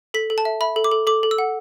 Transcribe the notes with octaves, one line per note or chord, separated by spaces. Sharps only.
A4 B6
A4
A5
E5
E5 B5
A4
D6
A4
A4 D6
A4
E6
F#5